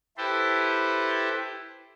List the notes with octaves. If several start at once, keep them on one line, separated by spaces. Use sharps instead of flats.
E4 G4 A4 B4 C5